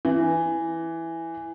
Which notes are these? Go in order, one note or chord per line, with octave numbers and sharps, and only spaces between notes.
E3